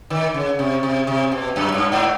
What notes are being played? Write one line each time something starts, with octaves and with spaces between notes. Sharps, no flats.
D#3
C#3
C3
C3
C3
B2
F#2
G2
G#2